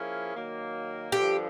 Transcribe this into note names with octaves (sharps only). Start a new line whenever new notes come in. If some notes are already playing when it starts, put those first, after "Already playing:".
Already playing: F3 A#3 C#4 E4 G#4
D#3 F#3 A#3
G2 D3 F3 G4